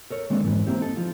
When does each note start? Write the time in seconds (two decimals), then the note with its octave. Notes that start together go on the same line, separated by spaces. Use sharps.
0.10 A4 A#4 C#5
0.30 D#3 G#3 A#3 C4 D4
0.43 F2 G#2 E3
0.67 A#3 C4 E4 G4
0.81 D#4 A4
0.97 F3 F4